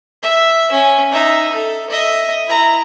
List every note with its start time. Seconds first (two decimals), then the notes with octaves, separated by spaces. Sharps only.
0.22 E5
0.72 C#4
1.12 D#4 E5
1.52 A4
1.90 D#5 E5
2.47 E4 A#5